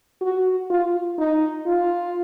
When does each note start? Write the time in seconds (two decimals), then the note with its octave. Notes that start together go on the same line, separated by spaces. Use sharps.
0.21 F#4
0.70 F4
1.18 D#4
1.67 F4